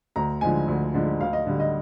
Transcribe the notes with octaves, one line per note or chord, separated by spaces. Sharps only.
D2 A#5
D3 F3 G#3 G#5
D2
D3 F3 G#3
D2 F5
D#5
D3 G3
D#5